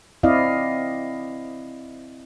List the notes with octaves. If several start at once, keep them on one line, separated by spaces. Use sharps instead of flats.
C4 E4 D5 D#5 F5